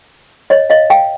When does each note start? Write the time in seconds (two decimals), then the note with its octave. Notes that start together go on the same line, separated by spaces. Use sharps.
0.50 C#5 D#5
0.70 D#5 F5
0.90 F5 G5